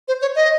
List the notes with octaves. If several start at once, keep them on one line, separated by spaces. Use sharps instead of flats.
C5
C#5
D#5